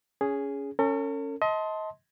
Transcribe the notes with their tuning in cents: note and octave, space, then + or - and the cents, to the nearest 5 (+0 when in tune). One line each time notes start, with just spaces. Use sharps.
C#4 +20 G#4 +0
C#4 +0 A4 +45
D#5 +30 A5 +0 C6 +0